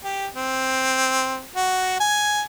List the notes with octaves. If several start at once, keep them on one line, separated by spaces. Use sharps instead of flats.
G4
C4
F#4
G#5